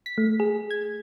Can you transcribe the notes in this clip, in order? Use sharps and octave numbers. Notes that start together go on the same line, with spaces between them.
B6
A3
G#4
G#6